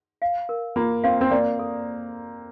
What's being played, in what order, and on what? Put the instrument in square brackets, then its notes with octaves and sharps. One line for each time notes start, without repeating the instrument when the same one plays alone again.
[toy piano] F5
A#4
[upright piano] A#3 [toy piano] F4
[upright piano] C4 [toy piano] F5
[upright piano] C4
[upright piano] A#3 [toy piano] D5
[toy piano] A4